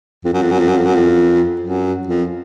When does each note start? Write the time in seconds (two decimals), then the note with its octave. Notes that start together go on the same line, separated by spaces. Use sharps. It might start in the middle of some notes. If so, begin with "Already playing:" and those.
0.25 F2
0.34 F#2
0.42 F2
0.51 F#2
0.59 F2
0.68 F#2
0.77 F2
0.86 F#2
0.95 F2
1.61 F#2
2.07 F2